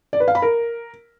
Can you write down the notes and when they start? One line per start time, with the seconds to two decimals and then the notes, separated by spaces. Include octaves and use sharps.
0.13 D5
0.20 B4
0.28 F5
0.35 B5
0.42 A#4